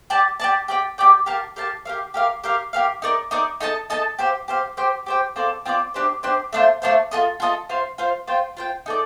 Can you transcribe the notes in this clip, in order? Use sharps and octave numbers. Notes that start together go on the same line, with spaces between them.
G4 D5 A5
G4 D5 A5
G4 D5 G5
G4 D5 G5
G4 A#4 F5 A5
G4 A#4 F5 A5
G4 A#4 F5
G4 A#4 F5
G4 A#4 F5
G4 A#4 F5
D#4 A#4 D5
D#4 A#4 D5
D#4 A4 D#5 A5
D#4 A4 D#5 A5
G4 C5 F5
G4 C5 F5
G4 C5 G5
G4 C5 G5
C4 F4 A4 D5
C4 F4 A4 D5
D4 G4 C5
D4 G4 C5
A3 D4 F4 C5
A3 D4 F4 C5
F4 A4 D#5
F4 A4 D#5
F4 C5 F5
F4 C5 F5
F4 C5 G5
F4 C5 G5
D#4 A4 D5